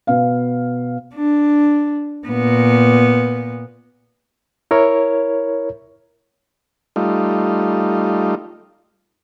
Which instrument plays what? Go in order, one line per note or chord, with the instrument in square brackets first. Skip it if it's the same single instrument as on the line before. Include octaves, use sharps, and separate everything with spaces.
[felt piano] B2 B3 F5
[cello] D4
A#2 B3
[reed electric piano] E4 A#4 C#5
[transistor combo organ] G3 A3 D#4 F4